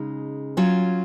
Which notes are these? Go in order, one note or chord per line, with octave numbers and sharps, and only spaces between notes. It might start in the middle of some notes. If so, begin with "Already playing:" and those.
Already playing: C#3 G#3 D#4
F#3 C#4 F4